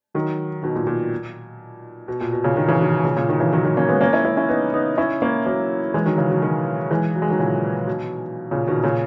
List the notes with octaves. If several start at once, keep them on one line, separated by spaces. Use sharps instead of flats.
D#3 F#3
B2 D#3
A#2
A#2
B2
A#2
B2
A#2 C#3
B2 D#3
C#3 E3
B2 D#3
B2
A#2 C#3
A#2 C#3
B2 D#3
C#3 E3
D#3 F#3
D#3 F#3
A#3 C#4
G#3 B3
A#3 C#4
C#4 E4
C#4 E4
C#4 E4
B3 D#4
B3 D#4
C#4 E4
A#3 C#4
F#3 A#3
E3 G#3
D#3 F#3
C#3 E3
B2 D#3
D#3 F#3
E3 G#3
F#3
G#3
D#3 F#3
A#2 C#3
B2
A#2 C#3
B2 D#3
A#2 C#3